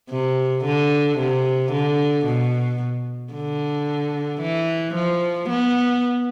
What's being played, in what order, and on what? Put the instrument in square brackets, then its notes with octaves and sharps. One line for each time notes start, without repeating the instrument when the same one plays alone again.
[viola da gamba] C3
D3
C3
D3
B2
D3
E3
F3
B3